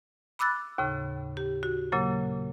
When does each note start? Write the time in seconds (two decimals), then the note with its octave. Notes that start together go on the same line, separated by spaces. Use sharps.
0.39 B5 D6 E6 F#6 A6
0.78 D#2 A2 C#3
1.37 G4
1.63 F#4
1.92 A#2 C#3 F#3 A#3